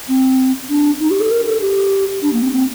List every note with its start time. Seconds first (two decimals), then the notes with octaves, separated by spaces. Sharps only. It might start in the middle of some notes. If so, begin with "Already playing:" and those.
0.08 C4
0.69 D4
1.00 D#4
1.11 G4
1.20 A4
1.31 A#4
1.46 A4
1.61 G4
2.22 D4
2.33 A#3
2.42 C4
2.52 C4